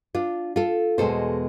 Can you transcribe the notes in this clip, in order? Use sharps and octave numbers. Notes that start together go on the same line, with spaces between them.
D4 F4
F4 A4
E2 B2 G#3 A4 C5